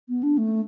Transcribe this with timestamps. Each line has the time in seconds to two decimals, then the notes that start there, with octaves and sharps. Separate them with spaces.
0.09 B3
0.23 D4
0.38 A3